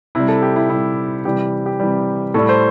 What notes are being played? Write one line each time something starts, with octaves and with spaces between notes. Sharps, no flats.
C3 G3 E4
A4
G4
E4
C3 G3 E4
C3 E3 G3 G4
G4
G4
C3 E3 G3
A2 G3 A4
C5